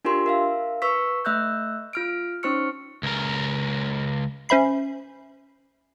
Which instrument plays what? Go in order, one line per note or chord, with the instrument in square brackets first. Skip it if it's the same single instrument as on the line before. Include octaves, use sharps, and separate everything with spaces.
[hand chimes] D4 F4 G4 A#4 C6
A#4 E5 F5
B4 C#6 E6 B6
A3 E5 E6 F#6 G6
F4 F6 D7
C#4 D#4 C5 C#6 F6 C#7
[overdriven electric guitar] C#2 A#4
[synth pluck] C#4 C5 E5 B5 C7